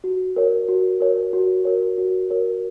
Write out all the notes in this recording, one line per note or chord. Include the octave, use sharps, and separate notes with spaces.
F#4
A#4 C#5
F#4
A#4 C#5
F#4
A#4 C#5
F#4
A#4 C#5